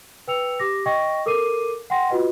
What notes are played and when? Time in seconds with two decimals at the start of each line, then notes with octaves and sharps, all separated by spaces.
0.28 B4 G5 E6 C#7 F7
0.59 G4 D6 A#6
0.86 D#5 G5 C#6 A#6
1.26 A4 A#4 D6 C7 D#7
1.90 F#5 G5 C6 A#6
2.10 F4 F#4 B4 D#5